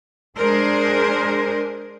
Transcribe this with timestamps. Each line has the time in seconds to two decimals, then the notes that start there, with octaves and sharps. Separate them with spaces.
0.37 G#3 D4 G#4 A#4 C5